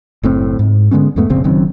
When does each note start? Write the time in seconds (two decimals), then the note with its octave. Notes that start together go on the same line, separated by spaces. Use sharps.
0.23 F#1 A2 C4
0.59 G#2
0.91 D3 G#3 B3 C#4
1.16 E2 G#2 A3 B3
1.29 F1 A#1 C#3 C4
1.44 F#1 F#2 D#3 C4